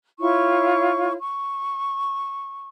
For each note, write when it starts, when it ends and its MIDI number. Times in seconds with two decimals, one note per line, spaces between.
0.19 1.15 64
0.19 1.15 65
0.19 1.15 73
0.19 1.15 85
1.20 2.68 85